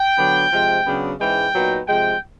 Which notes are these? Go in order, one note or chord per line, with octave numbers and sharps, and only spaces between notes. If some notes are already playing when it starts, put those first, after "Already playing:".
Already playing: G5
D3 F#3 B3 D4
C3 F3 G#3
C#3 F#3 B3 D4
G#2 E3 G#3 C#4 G5
A#2 F#3 B3 D#4
C3 F3 G#3 G5